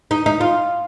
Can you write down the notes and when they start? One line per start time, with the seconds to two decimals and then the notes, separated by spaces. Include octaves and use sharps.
0.11 D#4
0.26 D#4
0.41 F4